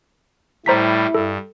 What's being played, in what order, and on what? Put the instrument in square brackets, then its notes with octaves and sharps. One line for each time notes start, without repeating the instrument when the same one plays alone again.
[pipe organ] A2 G3 [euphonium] E4 [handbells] C5 A#5 B6
[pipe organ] G2 [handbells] A4